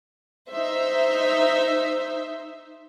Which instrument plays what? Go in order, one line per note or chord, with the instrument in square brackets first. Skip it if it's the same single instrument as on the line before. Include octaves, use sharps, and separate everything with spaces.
[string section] D#4 C5 E5